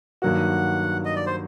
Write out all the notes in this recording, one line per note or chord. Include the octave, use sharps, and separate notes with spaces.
G2 D#3 F#3 A#3 F#4 F#5
D#5
D5
C5